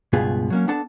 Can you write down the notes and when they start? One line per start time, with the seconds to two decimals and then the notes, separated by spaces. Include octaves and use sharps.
0.13 C#2 G2 B2 B3 F4 G#4
0.50 F#3 A#3 C#4
0.68 B3 D4 A4 F#5 A5